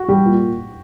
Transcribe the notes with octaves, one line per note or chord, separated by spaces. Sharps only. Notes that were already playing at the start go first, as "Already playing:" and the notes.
Already playing: F#4
G3 G4
A#2